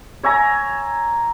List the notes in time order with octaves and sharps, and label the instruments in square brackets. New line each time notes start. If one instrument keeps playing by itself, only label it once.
[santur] C#5 E5 G#5 A#5